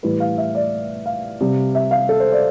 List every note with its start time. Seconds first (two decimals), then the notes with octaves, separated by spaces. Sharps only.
0.03 A2 E3 G3 B4
0.20 F5
0.38 E5
0.55 D5
1.06 F5
1.41 C3 G3
1.75 E5
1.91 F5
2.09 A4
2.20 C5
2.32 D5